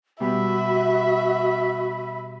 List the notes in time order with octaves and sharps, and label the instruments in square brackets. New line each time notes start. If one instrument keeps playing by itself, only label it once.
[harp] B2 G3 G4 [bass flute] F#4 [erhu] E5 [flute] B5